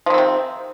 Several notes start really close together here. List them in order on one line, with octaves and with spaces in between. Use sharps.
F3 D#3 C4 C3